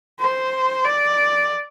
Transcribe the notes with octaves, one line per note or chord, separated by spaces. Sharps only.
C5
D5